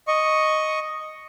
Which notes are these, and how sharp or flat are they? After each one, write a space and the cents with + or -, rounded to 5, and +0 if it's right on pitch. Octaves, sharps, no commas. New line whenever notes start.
D#5 +0 C#6 +0